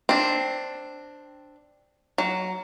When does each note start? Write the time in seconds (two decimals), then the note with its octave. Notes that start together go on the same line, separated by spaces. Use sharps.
0.09 C4 D4
2.18 F#3